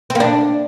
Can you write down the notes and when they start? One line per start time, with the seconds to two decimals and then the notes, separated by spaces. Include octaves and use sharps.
0.10 C4
0.15 A#3
0.20 D4